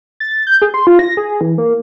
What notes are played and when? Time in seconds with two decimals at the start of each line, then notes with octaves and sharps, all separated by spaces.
0.20 A6
0.47 G6
0.62 G#4
0.74 C6
0.87 F4
0.99 A#6
1.17 G#4
1.41 E3
1.58 A#3